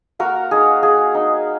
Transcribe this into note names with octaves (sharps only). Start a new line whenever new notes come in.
A#3 F#4 A#4
D#4 G#4
A#3 G#4
D#4